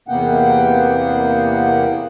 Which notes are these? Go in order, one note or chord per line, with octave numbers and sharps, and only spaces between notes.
E2 C3 A#3 B3 F#5 G5